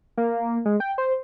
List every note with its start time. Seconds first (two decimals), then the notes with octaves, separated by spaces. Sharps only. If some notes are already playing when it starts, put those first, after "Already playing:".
0.17 A#3
0.65 G#3
0.80 G5
0.98 C5